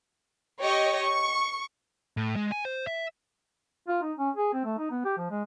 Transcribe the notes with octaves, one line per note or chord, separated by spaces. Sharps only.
G4 C#5 D#5 C#6
C#6
A2
G#3
G#5
C5
E5
F4
D#4
C#4
G#4
C4
A3
D#4
B3
G4
F3
G#3